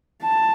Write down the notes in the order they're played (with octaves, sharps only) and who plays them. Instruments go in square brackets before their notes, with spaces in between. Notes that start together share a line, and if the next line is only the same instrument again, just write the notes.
[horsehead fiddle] A5